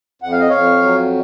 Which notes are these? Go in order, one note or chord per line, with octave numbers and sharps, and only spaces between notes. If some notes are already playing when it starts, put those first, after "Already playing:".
F2 F#5
F5
D#5
F2 C#5 F5
F#3